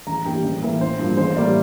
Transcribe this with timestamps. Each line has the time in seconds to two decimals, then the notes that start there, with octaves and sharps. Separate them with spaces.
0.07 A1 A#5
0.25 G2 E3 G3 A#3 G5
0.44 A1
0.62 A2 E3 A#3
0.81 A1 C5
0.99 G2 F3 A#3
1.17 A1 C5
1.36 A2 G3 A#3 D5